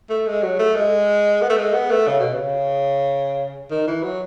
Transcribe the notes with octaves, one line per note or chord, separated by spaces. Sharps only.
A3
G#3
F#3
A3
G#3
B3
A3
G#3
B3
A3
C#3
B2
C#3
D#3
E3
F#3